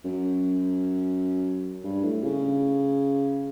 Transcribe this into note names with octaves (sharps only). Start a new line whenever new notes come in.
F#2
G2
A2
C#3